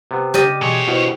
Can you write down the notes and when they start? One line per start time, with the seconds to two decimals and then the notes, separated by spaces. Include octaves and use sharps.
0.11 C3 B3
0.34 C#3 G4 D5 D#5 F6
0.61 B2 D3 E3 G#3 C#5
0.88 B2 E4 F4 C5